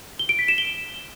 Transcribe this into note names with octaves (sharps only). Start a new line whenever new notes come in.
G7
D7
B6
E7
G7